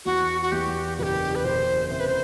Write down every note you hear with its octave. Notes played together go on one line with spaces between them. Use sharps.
E2 F#4
F#4
E2 G4
F#1 G4 B4
B4
F#1 C5
C3 C5
B4
C5